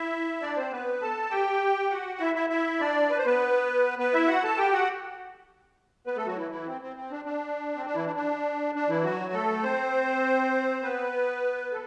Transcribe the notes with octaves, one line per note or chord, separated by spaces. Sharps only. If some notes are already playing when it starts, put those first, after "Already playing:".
Already playing: E4 E5
D4 D5
C4 C5
B3 B4
A4 A5
G4 G5
F#4 F#5
E4 E5
E4 E5
E4 E5
D4 D5
B4
C5
B3 B4
B3 B4
E4 E5
F#4 F#5
A4 A5
G4 G5
F#4 F#5
B3 B4
A3 A4
F#3 F#4
E3 E4
E3 E4
C4
C4
C4
D4
D4
C4
D4
E3 E4
D4
D4
D4
E3 E4
F#3 F#4
A3 A4
C4 C5
B3 B4
A4